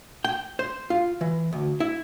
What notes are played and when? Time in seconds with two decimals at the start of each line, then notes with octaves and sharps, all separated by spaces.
0.24 G5
0.59 C5
0.90 F4
1.21 E3
1.53 D2
1.80 E4